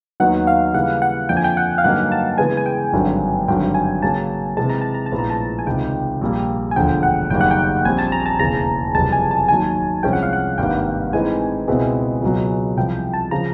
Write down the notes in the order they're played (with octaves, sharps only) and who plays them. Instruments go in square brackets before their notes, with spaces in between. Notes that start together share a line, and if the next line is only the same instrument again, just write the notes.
[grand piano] D#2 D#3 F#3 B3 D#4 [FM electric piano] F#5
[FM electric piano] F5
[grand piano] C#3 E3 G3 A#3 [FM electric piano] F#5
[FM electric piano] F#5
[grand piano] F2 D3 F3 A#3 [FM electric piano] G5
[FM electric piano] G#5
G5
F#5
F5
[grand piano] G2 D3 F#3 A#3 D#4 [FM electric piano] F#5
[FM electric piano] A5
[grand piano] C#3 E3 G#3 B3 [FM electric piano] G#5
[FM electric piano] G#5
G5
[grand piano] G#1 G2 D3 F#3
[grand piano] G#1 G2 D3 F#3 [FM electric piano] G5
[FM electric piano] G#5
[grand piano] C#3 F#3 A#3 [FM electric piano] A5
[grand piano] C3 E3 G#3 [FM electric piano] A5
[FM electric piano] A#5
A5
A#5
A5
[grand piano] A#1 A2 F3 G#3 B3
[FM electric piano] A#5
A5
G#5
[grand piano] C#2 C3 D#3 [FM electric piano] G5
[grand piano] A#1 A#2 G3 A#3
[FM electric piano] G#5
[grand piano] E1 D2 D3 F3 [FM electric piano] G5
[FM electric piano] F#5
[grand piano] F#1 F#2 D#3 G3 A#3 [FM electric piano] G5
[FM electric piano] F#5
G5
[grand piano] A#1 A#2 G3 C4 [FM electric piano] G#5
[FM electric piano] A5
A#5
A5
[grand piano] E1 D#2 C#3 E3 [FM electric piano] A#5
[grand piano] F#1 F2 C3 E3 G3 [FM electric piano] A5
[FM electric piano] G#5
A5
[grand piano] D#2 D#3 F#3 [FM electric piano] G#5
[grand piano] C2 C3 F3 G#3 C#4 [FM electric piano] G5
[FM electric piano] F#5
F5
F#5
[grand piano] G#1 G2 D#3 G3 A#3 [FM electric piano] G5
[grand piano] A2 E3 G#3 C4 D#4 [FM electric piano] G#5
[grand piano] C#2 B2 G#3 C4 E4
C#2 B2 F#3
[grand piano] C2 C3 F3 [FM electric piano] G5
[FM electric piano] A5
[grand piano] C#3 F3 [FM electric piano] A#5